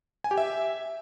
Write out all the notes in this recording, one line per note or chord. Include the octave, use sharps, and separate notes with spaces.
G#5
G4
E5